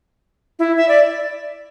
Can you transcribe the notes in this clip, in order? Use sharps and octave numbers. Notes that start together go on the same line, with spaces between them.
E4
E5
D5